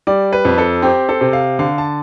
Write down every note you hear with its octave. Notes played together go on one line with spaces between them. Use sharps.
G3 D5
B4
F2
A4
C4 G4
A4
C3
F5
D3 F5
A5